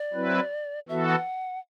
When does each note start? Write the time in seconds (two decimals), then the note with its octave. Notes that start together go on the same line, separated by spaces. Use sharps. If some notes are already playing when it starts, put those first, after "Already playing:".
Already playing: D5
0.13 F#3 C4 E4 B4
0.88 E3 B3 F#4 A4 E5
1.08 F#5